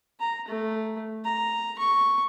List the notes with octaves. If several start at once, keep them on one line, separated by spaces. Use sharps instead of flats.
A#5
A3
A#5
C#6